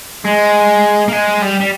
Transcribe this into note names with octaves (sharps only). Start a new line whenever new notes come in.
G#3
A#3
G#3
G3
G3